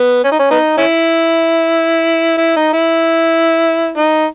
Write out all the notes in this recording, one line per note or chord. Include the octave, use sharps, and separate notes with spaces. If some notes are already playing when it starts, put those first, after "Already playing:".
Already playing: B3
C#4
D#4
C#4
B3 D#4
C#4 E4
E4
D#4
E4
D#4